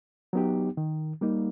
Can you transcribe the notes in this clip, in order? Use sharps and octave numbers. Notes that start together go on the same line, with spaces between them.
F#3 B3 D#4 G4
D#3
G3 A#3 D#4